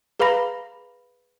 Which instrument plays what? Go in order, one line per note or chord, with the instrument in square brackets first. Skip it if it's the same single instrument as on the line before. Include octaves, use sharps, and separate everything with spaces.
[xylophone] G#4 B4 F5 A#5 B5 A#6